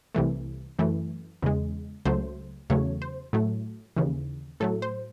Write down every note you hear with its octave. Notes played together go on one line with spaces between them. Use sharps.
C2 C3 E3 A3
F#2 E3 A3
E2 C#3 G#3
C#2 C#3 F#3 A3 C5
E2 C#3 F#3 A3 C#5
C5
A2 F#3 A3
D#2 C#3 E3
A2 F#3 A3 A4
C5